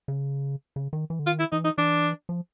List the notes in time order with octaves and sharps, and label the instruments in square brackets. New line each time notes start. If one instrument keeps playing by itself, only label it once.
[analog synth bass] C#3
C#3
D#3
E3
D3
[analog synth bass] D#3 [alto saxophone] F4
[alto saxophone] E4
[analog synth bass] E3 [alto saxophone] D#4
[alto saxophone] D#4
[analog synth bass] E3 [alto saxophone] D4
[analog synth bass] F3